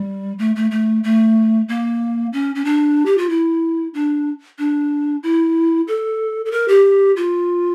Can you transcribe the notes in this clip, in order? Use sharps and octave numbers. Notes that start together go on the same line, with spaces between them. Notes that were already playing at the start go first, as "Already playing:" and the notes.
Already playing: G3
A3
A3
A3
A3
A#3
C#4
C#4
D4
G4
F4
E4
D4
D4
E4
A4
A4
A#4
G4
F4